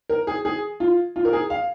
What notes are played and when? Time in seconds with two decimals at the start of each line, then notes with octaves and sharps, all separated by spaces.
0.09 A#4
0.27 G#4
0.45 G#4
0.80 F4
1.16 F4
1.25 A#4
1.33 G#4
1.50 F5